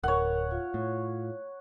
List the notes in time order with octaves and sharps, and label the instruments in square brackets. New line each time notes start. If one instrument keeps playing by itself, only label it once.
[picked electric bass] D1 [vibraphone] A#4 [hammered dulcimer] C#5 F#5
[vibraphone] F4 F5
[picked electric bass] A2